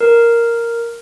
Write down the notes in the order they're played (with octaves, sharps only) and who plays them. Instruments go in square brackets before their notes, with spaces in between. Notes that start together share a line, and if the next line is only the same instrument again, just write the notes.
[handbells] A#4